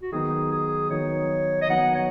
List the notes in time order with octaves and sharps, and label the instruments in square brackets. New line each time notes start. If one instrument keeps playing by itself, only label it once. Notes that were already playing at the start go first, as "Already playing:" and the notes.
[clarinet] F#4
[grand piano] D#3 F#3 B3 D#4 [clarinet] G#4
[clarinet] G#4
[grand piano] D#3 F#3 B3 D#4 [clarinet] C#5
[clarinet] D#5
[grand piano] D#3 F#3 B3 D#4 [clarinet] F#5
[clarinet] C#5